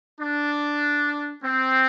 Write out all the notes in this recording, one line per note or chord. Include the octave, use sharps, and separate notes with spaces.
D4
C4